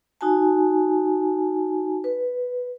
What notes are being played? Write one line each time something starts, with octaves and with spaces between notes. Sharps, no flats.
D#4 F#4 G#5 A5
B4